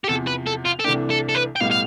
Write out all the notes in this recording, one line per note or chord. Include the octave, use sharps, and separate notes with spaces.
G4
E2 C3 F3 A4
B4
A4
F4
A4
C2 C3 E3 A3 D4 G4
A4
A4
B4
G5
B1 A2 G3 B3 F5
F5